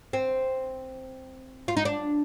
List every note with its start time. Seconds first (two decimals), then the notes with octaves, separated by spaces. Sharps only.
0.13 C4
1.68 F4
1.77 D#4
1.85 D4